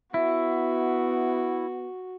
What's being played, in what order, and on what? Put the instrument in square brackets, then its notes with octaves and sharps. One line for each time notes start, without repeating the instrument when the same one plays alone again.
[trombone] B3 [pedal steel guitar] E4 [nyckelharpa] F#4 [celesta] E5